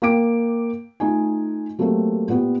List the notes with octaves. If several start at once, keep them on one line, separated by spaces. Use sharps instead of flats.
A#3 G5 D6 D7
A3 D#4 F4 G#5
F#3 A3 A#3 C4 G4 A4
A#2 B3 G4